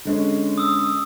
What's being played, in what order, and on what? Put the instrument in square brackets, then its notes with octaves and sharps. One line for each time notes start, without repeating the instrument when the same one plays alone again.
[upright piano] D3 G#3 C#4
[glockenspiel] D#6 E6